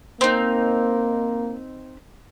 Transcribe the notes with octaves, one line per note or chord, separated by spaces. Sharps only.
A#3 C4 D#4